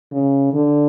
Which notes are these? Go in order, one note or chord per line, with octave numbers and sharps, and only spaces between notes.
C#3
D3